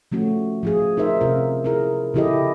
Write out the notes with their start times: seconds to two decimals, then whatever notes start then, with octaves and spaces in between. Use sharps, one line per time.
0.12 F3 A3 C#4 F#4
0.63 F3 F4 G#4
0.97 D#4 A#4 C5 E5
1.21 C3 C#4 F4 A#4
1.64 E4 G#4 A#4
2.14 C#3 F3 E4 G4 A4 D#5